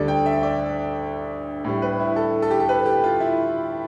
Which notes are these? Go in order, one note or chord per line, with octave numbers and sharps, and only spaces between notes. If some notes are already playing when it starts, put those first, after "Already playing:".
Already playing: D2 D3 G3 A4 D5
G5
E5
D5
A2 G3
B4
E4
A4
A4
G4
A4
B4
G4
F4
E4